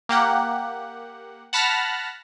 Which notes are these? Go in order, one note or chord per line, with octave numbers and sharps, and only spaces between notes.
A#3 G4 F#5
F#5 A5 B5 F6 F#6 A#6